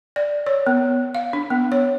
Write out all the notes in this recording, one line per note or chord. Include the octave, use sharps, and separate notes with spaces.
D5
C#5
B3
F5
D4
B3
C#5